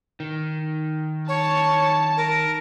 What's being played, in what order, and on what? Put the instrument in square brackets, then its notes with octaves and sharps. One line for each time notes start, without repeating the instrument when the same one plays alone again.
[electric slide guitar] D#3
[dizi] C#5 [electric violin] A5
[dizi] A#4